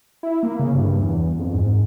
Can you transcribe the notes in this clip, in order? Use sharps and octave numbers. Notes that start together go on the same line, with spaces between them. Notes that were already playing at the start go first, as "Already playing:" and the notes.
E4
A#3
C#3
G2
E2
F2
G#2